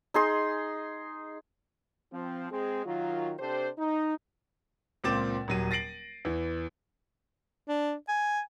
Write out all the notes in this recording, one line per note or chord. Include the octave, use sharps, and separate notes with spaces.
D#4 G#4 C6
F3 C4
G#3 C4 G#4
D#3 F#3 F4
C3 D4 G4 A4 C5
D#4
C#2 A#2 C4 D6 A6 E7
D#1 F#3 D#7
A6 A#6 C7 D7 F#7
E2 E3
D4
G#5